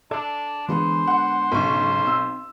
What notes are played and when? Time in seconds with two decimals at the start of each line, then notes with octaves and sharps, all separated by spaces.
0.11 D4 A4 D5 E5
0.69 D3 E3 G#3 B3 C5
1.07 F#5 C6
1.52 B1 G#2 C#3 E5 C#6
2.07 C4 E6